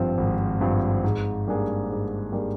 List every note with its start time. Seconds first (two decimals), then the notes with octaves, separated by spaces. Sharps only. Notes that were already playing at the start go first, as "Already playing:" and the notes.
Already playing: G#1 G2 F3 C4
0.18 G#1
0.61 G2 F3 C4
1.04 G#2
1.47 G3 A#3 D4 G#4
1.89 G#2
2.32 G3 A#3 D4 G#4